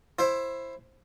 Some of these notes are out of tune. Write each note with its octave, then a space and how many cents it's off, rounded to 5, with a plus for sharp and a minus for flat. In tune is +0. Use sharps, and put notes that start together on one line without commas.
E4 +15 C5 +15